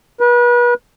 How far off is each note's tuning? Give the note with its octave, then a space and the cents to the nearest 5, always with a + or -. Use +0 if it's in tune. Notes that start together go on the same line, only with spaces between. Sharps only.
B4 -35